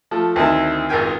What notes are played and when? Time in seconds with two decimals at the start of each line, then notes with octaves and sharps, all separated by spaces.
0.11 F3 A3
0.36 D2 D#3 C4 D#4 E4 A5
0.89 G#1 C#2 A#4 G5 G#5